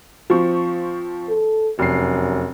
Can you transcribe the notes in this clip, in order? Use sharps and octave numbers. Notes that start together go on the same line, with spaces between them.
F3 C4 C#6
A4
F1 F#2 C7